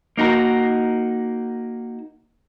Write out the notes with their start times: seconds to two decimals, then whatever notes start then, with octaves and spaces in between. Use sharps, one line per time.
0.17 A#3 D#4 F#4 A#4